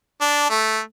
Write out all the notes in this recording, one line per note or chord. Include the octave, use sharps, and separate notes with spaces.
D4
A3